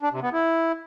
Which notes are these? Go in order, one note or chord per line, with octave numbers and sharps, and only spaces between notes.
D4
C3
B3
E4